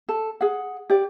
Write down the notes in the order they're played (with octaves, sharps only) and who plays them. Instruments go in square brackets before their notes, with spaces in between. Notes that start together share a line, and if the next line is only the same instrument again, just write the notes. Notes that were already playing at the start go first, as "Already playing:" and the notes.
[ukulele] A4
G#4 F#5
G4 D5